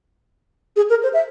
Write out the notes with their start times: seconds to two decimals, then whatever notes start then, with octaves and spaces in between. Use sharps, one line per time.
0.76 G#4
0.90 A#4
1.03 C5
1.13 E5